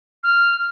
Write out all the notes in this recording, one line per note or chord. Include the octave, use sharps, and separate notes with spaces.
F6